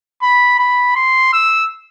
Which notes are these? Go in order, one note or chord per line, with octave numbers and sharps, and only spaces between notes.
B5
B5
C6
E6